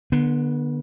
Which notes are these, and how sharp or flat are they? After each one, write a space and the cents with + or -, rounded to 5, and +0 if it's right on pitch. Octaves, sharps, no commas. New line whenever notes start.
D3 +20 B3 -30